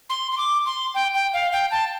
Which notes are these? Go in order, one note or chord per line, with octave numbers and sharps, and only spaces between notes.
C6
C6
D6
C6
G5
G5
F5
G5
A5